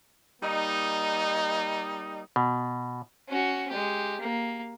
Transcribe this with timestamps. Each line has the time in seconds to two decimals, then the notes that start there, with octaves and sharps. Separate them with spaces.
0.42 G3 A#3 D#4
2.36 B2
3.29 C#4 F#4
3.70 G#3 G4
4.21 A#3